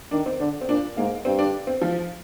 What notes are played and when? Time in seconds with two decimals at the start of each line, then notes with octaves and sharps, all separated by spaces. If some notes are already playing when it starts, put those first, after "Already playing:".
0.11 D#3 D4
0.26 C4
0.40 D3 D4
0.61 C4
0.69 A#2 D4
0.97 G#2 A#3
1.24 G2 C4
1.39 D4
1.67 C4
1.81 F3